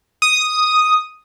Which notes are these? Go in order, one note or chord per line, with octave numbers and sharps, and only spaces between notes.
D#6